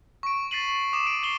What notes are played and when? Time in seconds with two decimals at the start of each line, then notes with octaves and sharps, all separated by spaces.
0.23 C#6 D7
0.51 A6 B6 C7 D#7 F#7
0.93 D6 D#6 E7
1.06 D6 D7
1.23 C7 F#7 G7